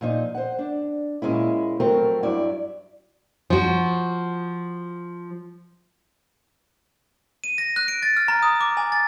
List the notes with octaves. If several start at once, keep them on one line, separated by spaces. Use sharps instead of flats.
A#2 F3 D#4
C5 F#5
D4
A#2 G#3 C#4 E4
F3 F#3 A3 C4 A#4
G2 F#3 E4 D5
F3 F#4
D#7
A#6
F#6
D7
A6
F6
A#5
D#6
D6
G#5
A6